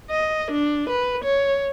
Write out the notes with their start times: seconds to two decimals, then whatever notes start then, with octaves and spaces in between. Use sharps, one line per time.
0.10 D#5
0.51 D4
0.89 B4
1.24 C#5